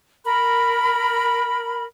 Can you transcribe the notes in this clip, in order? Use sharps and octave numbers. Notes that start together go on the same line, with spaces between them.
A#4 B5